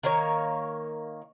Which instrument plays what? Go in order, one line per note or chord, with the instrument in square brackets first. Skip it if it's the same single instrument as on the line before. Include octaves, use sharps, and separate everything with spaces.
[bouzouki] D#3 A#3 C#5